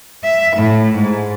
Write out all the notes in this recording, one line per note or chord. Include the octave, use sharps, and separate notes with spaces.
E5
A2
G#2